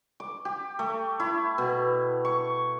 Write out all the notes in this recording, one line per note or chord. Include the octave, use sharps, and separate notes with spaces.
D6
G4
A3
E4
B2
C#6